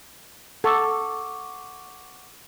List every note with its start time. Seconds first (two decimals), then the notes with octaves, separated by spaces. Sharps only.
0.64 A4 F#5 C#6 D6